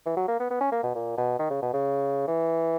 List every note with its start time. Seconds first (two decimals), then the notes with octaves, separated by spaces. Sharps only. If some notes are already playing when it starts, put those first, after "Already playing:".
0.06 E3
0.17 F#3
0.28 A#3
0.40 B3
0.50 B3
0.61 C#4
0.72 A#3
0.83 B2
0.95 A#2
1.18 B2
1.39 D#3
1.50 C#3
1.62 B2
1.73 C#3
2.28 E3